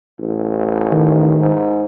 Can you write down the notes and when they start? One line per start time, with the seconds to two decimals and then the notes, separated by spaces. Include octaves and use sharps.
0.19 A1
0.92 D#3
1.40 G#2